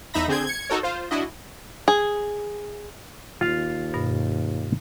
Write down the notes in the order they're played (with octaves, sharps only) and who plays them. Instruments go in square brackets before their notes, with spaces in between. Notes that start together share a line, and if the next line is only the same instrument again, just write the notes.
[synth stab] E2 D#4 E5 B5 A#6
D3 C4 G#4 G6 G#6
G#6 C#7
D#4 F#4 A4 A#4 C#5
F4 C5
D4 E4 F#4 D#5
[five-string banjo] G#4
[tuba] D#2 [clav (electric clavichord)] F4 F5
[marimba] G2 B2